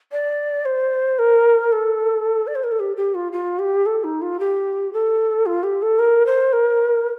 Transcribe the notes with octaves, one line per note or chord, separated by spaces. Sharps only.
D5
C5
A#4
A4
D5
C5
A#4
A4
G4
G4
F4
F4
G4
A4
D#4
F4
G4
A4
F4
G4
A4
A#4
C5
A#4